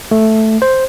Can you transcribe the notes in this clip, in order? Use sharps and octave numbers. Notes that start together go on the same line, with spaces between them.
A3
C5